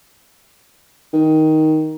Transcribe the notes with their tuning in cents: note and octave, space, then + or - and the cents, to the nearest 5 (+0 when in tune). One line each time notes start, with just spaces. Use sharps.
D#3 +10